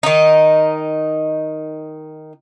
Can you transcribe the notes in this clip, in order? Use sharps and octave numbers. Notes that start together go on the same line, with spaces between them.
D#3 D#4